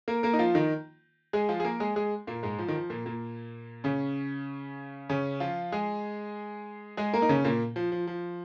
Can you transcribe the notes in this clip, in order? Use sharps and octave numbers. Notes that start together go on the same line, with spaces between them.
A#3 A#4
A#3 A#4
D#4
F3 F4
D#3 D#4
G#3 G#4
F3 F4
G#4
A#3 A#4
G#3 G#4
G#3 G#4
A#2 A#3
G#2 G#3
F3
D#3
F3
A#2 A#3
A#2 A#3
C#3 C#4
C#3 C#4
F3 F4
G#3 G#4
G#3 G#4
A#3 A#4
D#4
C#3 C#4
A#2 A#3
F3
F3
F3